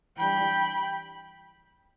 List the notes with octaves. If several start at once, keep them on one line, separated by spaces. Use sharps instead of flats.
E3 G3 D4 G5 B5